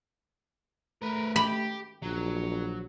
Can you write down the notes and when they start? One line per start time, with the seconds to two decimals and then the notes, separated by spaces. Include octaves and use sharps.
1.02 A3 A#4 B4
1.36 G4 B5
2.03 A#1 F#3